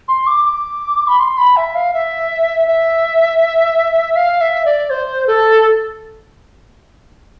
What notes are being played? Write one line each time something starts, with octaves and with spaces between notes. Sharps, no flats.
C6
D6
D6
B5
C6
B5
E5
F5
E5
E5
F5
E5
D5
C5
A4